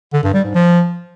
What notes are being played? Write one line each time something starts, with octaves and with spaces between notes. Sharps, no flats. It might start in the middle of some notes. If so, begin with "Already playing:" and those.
D3
G2
G3
G#2
F3